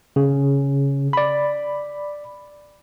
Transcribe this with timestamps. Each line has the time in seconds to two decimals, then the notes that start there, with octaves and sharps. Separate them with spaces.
0.16 C#3
1.13 D5 B5